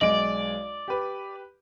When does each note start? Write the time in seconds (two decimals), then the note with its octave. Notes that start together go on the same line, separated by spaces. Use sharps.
0.01 B1 G#3 D5 D#5 D7
0.88 G4 B4